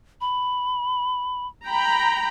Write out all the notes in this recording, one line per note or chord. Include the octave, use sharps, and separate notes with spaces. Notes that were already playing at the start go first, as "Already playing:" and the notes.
B5
G5 A#5 B5